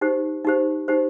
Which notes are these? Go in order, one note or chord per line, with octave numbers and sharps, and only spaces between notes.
D#4 G4 C5
D#4 G4 C5
D#4 G4 C5